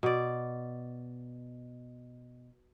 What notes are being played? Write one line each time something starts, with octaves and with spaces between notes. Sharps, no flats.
B2 D5